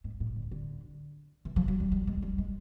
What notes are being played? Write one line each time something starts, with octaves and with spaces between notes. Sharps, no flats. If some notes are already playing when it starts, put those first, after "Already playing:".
G#2
A2
D3
D3
E3
F3
F#3
G3
G3
G#3
G3
G#3